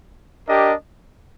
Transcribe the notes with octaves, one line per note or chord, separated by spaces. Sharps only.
D4 G4 A#4 D#5